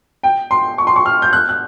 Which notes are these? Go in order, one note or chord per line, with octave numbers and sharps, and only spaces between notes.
G5
C6
C#6
C6
C#6
F6
G6
F#6
F#6